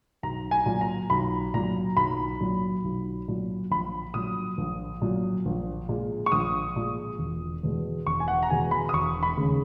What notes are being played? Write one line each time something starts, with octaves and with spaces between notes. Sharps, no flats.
B1 A#5
G#5
A#2 F#3
A#5
B1 B5
A#2 F#3 A#5
B1 B5
A#2 F#3
B1
A#2 F#3
A#1 B5
A#2 F#3 D#6
A#1
A#2 F#3
A#1
A#2 G#3
C#6
A#1 D#6
A#2 G#3
E1
E2 B2 G#3
E1 C#6
G#5
F#5
A#5
E2 B2 G#3 G#5
B5
D#6
E1 C#6
B5
D#2 C#3 G#3